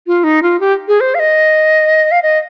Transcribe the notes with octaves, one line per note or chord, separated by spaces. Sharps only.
F4
D#4
F4
G4
G#4
C5
F5
D#5
F5
D#5